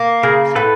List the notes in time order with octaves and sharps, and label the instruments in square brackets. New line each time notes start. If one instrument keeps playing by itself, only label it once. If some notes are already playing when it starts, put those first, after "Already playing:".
Already playing: [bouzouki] A#3
[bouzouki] C#3 [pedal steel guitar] G#4 A#4
[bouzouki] A2 [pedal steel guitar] A4 B4